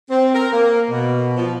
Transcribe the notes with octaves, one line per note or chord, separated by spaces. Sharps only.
C4
A#4
A#3
B2
F3